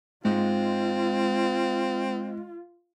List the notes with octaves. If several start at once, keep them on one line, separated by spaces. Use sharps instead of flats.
G#2 G#3 C4 F4